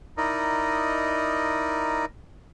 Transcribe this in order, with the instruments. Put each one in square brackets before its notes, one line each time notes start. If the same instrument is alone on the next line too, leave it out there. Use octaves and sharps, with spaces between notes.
[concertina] D#4 E4 A#4 D5 D#5